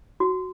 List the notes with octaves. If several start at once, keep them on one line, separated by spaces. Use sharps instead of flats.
F#4